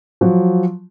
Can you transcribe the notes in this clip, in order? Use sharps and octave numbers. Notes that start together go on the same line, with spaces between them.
F3 F#3